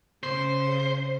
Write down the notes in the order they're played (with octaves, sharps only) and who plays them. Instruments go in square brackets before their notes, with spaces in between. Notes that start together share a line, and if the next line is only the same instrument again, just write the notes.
[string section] C#3 [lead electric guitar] C5